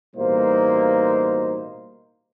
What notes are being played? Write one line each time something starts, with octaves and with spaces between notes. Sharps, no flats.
A1 B2 G3 A#3 D#4 C5